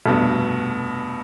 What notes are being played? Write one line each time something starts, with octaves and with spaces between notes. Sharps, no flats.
F1 G2 B2